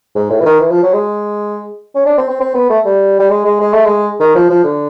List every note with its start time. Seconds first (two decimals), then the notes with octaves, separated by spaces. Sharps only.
0.15 G#2
0.30 A2
0.41 E3
0.45 D#3
0.60 E3
0.71 F3
0.83 F#3
0.93 G#3
1.95 C#4
2.06 D4
2.18 C4
2.29 C4
2.40 C4
2.55 B3
2.70 A3
2.86 G3
3.19 G3
3.30 G#3
3.45 G#3
3.60 G#3
3.73 A3
3.85 G#3
4.20 D#3
4.35 F3
4.50 F3
4.64 D3